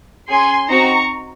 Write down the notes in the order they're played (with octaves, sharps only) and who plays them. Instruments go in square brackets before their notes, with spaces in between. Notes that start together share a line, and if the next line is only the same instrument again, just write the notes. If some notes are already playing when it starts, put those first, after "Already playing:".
[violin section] C#4 G#4 G#5 C6
C4 D#4 F#4 A#5 C#6